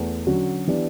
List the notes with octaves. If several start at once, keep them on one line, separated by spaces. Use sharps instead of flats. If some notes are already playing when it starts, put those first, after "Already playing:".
Already playing: E2 A3
D3 F#3 C#4 F#4
E3 B3 D4 G4